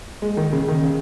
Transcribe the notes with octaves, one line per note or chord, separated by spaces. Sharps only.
G#3
D#3
C#3
D#3
C#3